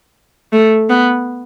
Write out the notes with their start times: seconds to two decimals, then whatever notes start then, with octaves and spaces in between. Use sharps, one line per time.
0.53 A3
0.89 B3